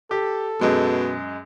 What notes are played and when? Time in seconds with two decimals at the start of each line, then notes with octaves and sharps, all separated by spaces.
0.11 G4 A4
0.61 F#2 B2 G#3